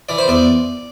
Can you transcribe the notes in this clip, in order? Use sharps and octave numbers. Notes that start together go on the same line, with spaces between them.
E3 D5
C5
E2 D5